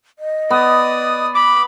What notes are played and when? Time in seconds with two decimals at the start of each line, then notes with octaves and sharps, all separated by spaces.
0.19 D#5
0.50 B3 D5 D#6
1.35 B5 D6